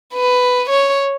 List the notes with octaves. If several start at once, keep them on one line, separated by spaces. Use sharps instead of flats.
B4
C#5